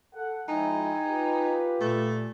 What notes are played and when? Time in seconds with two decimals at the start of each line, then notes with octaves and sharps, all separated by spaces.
0.14 A4 F#5
0.49 F3 G#3 D#4 E4 G5 G#5
1.06 F4 G4 B4
1.81 A#2 A3